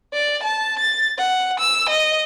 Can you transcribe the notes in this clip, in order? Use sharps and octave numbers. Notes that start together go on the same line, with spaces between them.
D5
A5
A6
F#5
E6
D#5